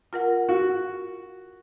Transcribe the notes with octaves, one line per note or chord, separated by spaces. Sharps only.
F4 A#4 F#5
F#4